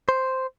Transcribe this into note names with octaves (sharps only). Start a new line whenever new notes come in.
C5